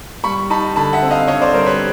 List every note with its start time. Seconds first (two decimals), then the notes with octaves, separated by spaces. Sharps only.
0.24 G3 B5 C#6
0.50 D#4 A5 B5
0.76 D3 A5 B5
0.93 E5 F#5
1.03 C4
1.11 D#5 F5
1.27 D3 C#5 D#5
1.42 C5 D5
1.53 G3 A#4 C5
1.66 B4 C#5